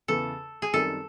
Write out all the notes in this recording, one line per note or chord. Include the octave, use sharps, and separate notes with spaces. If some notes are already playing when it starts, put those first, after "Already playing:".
E2 C#3 E3 A4
G#4
F#2 D#3 G3 C4 A4